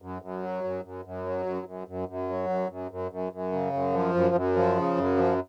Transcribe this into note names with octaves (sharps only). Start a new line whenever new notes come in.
F#2
F#2
F#3
F#2
F#2
F#2
F#3
F#2
F#2
F#2
F#2
F#3
F#2
F#2
F#2
F#2
F#2
C#3
F#2
F3
F#2
F#2
F3
C#3
F#2
F3